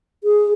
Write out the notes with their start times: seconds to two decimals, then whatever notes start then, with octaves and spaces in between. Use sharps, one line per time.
0.24 G#4